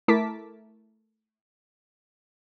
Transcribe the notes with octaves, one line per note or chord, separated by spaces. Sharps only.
A3 E4 A#4 A5 D6 B6